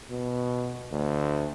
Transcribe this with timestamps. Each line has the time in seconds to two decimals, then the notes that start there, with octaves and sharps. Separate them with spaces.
0.11 B2
0.92 D2